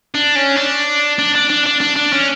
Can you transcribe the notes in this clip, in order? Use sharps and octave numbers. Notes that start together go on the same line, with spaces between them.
D4
C#4
D4
D4
D4
D4
D4
D4
D4
C#4